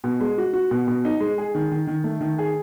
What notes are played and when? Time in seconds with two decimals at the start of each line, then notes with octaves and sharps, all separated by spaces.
0.04 B2
0.20 G#3
0.38 F#4
0.53 F#4
0.71 B2
0.88 B2
1.05 D#4
1.20 G#3
1.38 G#4
1.55 D#3
1.71 D#3
1.87 D#3
2.04 A3
2.21 D#3
2.38 G#4